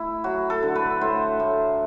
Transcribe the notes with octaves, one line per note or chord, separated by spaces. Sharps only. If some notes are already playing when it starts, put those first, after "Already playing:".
Already playing: A3 E4
F#3 F#4
A4
D3
B4
A2 C5
A2